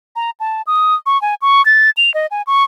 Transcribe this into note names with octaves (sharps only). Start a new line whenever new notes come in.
A#5
A5
D#6
C#6
G#5
C#6
A6
F7
D#5
G#5
C#6